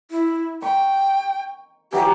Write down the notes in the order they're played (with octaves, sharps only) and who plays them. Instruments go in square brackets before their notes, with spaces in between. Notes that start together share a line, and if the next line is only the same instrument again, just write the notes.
[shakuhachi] E4
[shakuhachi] G5 [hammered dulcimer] C#6
[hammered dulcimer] E3 F#3 F#4 [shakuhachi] G4